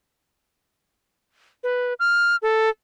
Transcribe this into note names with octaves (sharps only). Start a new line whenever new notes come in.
B4
F6
A4